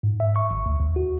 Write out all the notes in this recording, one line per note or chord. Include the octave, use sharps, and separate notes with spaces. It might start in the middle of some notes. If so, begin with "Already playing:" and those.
G#2
E5
C#6
G#1
D2
D#2
F#4